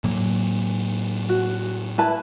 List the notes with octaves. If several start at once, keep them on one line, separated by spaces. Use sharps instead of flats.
A2 F#3 A#3
F#4
E4 B4 A5